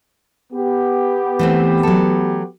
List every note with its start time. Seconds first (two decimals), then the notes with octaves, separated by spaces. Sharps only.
0.52 B3 G4
1.39 E3 A3 C4
1.83 F#3 A4